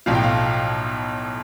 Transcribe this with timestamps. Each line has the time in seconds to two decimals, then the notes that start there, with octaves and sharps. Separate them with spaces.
0.06 B1 A2 F3 F5
0.15 G5
0.24 F5